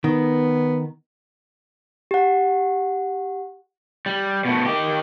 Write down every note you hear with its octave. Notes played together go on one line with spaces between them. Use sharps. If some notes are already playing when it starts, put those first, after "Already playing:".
D#3 B3
G4 F#5
G3
B2 A3
D#3 G4